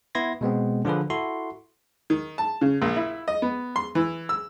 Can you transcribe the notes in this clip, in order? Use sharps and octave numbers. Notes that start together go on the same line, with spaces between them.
B3 E4 C6 G#6 A#6
B2 G#3 B3 C4
D3 F3 F4 G#4 B4
E4 F#4 A4 C6
D#3
A5
C#3
A#1
E4
D#5
B3
C6
E3
E6